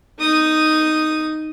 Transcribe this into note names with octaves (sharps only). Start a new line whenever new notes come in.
D#4 D#6